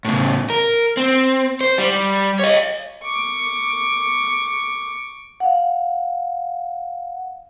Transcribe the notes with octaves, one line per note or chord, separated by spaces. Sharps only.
A2 C#3
A#4
C4
C5
G3
C#5 D#5
C#6 D6
F5 F#5